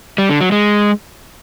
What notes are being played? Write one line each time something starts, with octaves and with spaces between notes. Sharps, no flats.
G3
D3
F#3
G#3